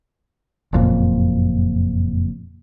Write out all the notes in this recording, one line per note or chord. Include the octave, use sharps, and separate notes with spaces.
F#1 F2 A#2